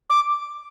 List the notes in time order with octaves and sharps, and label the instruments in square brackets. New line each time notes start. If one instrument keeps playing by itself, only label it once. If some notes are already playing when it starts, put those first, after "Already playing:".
[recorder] D6